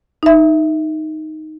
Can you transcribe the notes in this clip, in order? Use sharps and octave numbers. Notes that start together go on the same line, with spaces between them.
D#4 E5